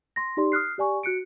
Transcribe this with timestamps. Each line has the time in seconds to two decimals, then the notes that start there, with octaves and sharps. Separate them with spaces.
0.16 C6 A#6
0.37 D#4 G4 D5 C6
0.52 D#6 F6 F#6 C7
0.78 G4 D5 G#5 C#6
1.03 F#4 F#6 C#7 D7